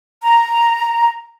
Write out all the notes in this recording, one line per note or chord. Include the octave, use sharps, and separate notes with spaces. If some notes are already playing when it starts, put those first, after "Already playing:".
A#5